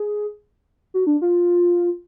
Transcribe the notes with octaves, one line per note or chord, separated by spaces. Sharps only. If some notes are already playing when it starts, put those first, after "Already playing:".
Already playing: G#4
F#4
D4
F4